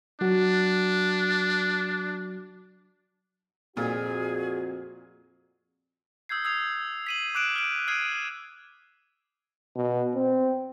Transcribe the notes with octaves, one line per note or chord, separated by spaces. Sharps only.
F#3 D4 F#4
F2 A#2 F#4 G#4
D#6 E6 G6 G#6 C7
D#6 E6 G#6 C7 F7
B6 D#7 F#7
D6 F#6 D7 E7
F6 D7
D#6 F6 G#6 C7 D7 D#7
B2
C4